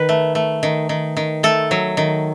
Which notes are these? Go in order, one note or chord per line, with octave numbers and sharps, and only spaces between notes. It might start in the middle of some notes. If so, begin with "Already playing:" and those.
Already playing: D#3 B4
A3
A3
D#3
D#3
D#3
A3 A4
F#3
D#3